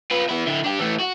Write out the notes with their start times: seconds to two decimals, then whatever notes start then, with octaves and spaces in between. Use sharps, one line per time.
0.11 F4 B4
0.29 B3 E4
0.47 D3 E4
0.64 D4 G4
0.79 E3 A3
1.00 F#4